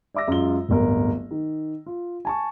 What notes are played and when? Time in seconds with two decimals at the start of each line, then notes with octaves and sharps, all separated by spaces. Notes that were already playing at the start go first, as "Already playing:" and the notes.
0.14 D5 E5 D6 E6 A#6
0.28 F#2 G#3 F4 G7
0.69 D1 G1 A#4
1.31 D#3
1.86 F4
2.25 G#5 A5 C#6